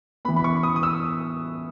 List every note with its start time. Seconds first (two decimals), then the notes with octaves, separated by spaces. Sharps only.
0.25 B3 B5
0.28 E3
0.36 B5
0.44 C#6
0.63 D#6
0.76 D#6
0.83 E6